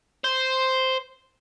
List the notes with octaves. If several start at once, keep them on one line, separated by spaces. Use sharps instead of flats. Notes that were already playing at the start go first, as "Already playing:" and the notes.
C5